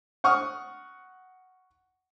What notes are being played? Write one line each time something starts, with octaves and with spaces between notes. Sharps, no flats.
F#5 C#6 D#6 F6